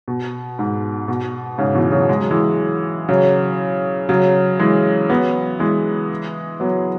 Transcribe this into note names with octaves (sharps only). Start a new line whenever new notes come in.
B2
G#2
B2
G#2 C#3
B2 E3
C#3 F#3
G#3
F#3
E3 G#3
C#3 F#3
C#3 F#3
E3 G#3
F#3 B3
E3 G#3
F#3 B3